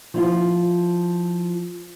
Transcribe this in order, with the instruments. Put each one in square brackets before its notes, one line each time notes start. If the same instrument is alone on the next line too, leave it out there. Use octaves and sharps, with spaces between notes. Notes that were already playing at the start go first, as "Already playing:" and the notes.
[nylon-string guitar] F3 E4 F4